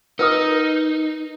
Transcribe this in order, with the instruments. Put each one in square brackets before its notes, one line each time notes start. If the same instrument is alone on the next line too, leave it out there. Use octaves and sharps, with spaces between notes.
[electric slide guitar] D#4 [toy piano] A#4 B4 D#6